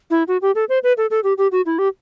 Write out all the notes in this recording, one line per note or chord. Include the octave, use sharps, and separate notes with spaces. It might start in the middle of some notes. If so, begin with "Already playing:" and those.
E4
F#4
G4
A4
C5
B4
A4
A4
G4
G4
F#4
E4
G4